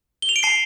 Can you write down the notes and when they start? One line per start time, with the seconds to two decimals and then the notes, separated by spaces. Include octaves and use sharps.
0.22 G7
0.29 F7
0.36 D7
0.43 A5 C7